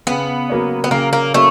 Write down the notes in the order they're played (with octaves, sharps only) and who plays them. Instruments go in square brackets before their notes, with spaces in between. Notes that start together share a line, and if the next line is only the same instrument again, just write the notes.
[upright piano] C#3 [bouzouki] B3
[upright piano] F#3 A#3 C#4
[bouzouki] B3
[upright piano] C#3 [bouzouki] A#3
[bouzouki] A#3
[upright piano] F#3 A#3 C#4 [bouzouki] A3